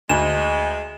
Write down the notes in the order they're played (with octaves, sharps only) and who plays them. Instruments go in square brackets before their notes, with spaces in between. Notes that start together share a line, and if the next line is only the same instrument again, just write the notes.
[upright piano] D2 [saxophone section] G#3 [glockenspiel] E7